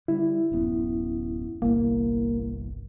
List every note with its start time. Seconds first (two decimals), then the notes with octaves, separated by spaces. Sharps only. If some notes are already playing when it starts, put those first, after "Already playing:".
0.08 D3 G3 E4
0.52 D1 F#2 B3
1.62 G1 C2 A#3